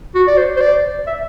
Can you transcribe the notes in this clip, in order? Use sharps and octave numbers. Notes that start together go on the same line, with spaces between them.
F#4
D5
C5
C5
D5
E5